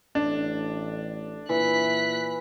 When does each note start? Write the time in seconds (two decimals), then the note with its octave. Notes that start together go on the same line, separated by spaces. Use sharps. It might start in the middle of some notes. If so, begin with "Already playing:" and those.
0.15 A1 D4
1.49 A#2 E3 F#6 B6